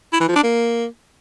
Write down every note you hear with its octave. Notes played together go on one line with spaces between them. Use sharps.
E4
E3
F3
D4
A#3